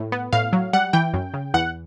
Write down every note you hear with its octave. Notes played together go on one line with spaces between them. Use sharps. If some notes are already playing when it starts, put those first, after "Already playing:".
Already playing: A2
B3
A2 F5
F#3
G3 F#5
E3 G5
F#2
C#3
E2 F#5